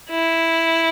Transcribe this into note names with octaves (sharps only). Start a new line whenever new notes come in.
E4